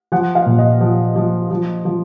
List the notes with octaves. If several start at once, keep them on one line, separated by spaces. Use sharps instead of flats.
F3 F#5
F5
A#2
D#5
F3
F3
F3
F3